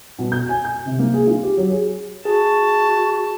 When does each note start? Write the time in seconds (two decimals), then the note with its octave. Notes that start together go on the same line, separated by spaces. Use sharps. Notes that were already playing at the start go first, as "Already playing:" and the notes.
0.19 B2
0.32 G6
0.49 G#5
0.65 G6
0.86 C3
0.99 A#3
1.14 G#4
1.27 F4
1.43 G4
1.57 F#3
1.70 G#4
2.25 F#4 G#4 A5